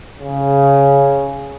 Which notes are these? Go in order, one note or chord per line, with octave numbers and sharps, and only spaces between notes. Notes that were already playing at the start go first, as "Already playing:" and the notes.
C#3